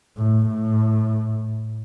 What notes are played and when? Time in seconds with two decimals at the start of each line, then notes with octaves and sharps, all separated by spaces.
0.17 A2
0.47 A2